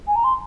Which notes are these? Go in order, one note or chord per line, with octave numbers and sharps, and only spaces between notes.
G#5
A#5
C6